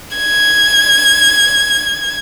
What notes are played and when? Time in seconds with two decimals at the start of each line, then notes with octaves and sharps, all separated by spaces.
0.16 G#6